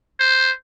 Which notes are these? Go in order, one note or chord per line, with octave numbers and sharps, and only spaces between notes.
C5